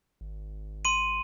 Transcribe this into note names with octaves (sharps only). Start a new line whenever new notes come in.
G#1
C6 D#7